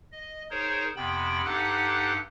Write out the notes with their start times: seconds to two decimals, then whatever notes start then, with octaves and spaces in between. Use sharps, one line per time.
0.12 D#5
0.51 D#4 G#4 A#4 C5 C#5
0.96 F2 C3 B3 G5 B5
1.45 G2 D#4 G4 A4 F#5 F#6